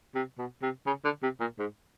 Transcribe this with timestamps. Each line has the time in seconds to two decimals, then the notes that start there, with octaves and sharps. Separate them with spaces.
0.15 C3
0.38 B2
0.62 C3
0.86 C#3
1.05 D3
1.23 C3
1.40 A#2
1.59 G#2